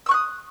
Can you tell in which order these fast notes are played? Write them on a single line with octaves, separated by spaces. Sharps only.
E6 C#6 F#6 D#6